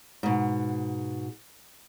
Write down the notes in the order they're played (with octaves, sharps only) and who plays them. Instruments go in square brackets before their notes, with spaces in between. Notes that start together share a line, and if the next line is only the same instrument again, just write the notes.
[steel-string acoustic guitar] G#2 B2